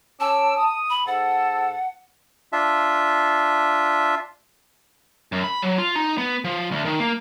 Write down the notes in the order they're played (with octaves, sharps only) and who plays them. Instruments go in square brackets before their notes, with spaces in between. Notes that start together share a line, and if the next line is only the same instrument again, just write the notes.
[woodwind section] C#4 D6 E6 [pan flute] A5
[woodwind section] D#6
[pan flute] B5
[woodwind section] G#2 A4 A5 [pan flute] F#5
[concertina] D4 F4 E5
[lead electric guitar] F#2
B5
F#3
F4
D#4
B3
F3
D2
D#3
A#3